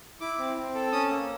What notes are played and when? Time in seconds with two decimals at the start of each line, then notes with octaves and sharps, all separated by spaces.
0.21 E4 D6
0.39 C4
0.56 C4
0.75 A4
0.92 C#4 D#6
1.10 A#3